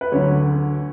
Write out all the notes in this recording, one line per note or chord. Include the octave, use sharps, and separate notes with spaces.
B4
D2 D3 F#3 C#5